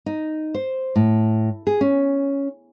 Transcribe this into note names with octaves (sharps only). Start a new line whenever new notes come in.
D#4
C5
A2
G#4
C#4